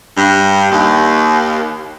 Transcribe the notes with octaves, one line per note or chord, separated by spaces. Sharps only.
G2
D#2